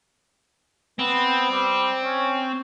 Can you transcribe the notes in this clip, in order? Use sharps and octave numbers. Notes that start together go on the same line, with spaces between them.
B3 C4
G3
C#4